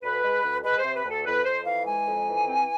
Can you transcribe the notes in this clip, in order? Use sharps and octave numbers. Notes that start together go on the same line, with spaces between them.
D2 B4
G#3
D2
G#3 B4
C5
C3
B4
D2
A4
F2 B4
F2 C5
E3 F5
G#3 G#5
F2
E3
C4